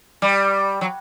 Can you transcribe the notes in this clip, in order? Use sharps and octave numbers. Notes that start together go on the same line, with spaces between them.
G3
F#3